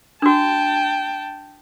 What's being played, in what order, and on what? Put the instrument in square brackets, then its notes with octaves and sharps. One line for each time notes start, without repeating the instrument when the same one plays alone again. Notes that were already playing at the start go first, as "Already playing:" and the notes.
[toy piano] D4 F#4 [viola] G5 A5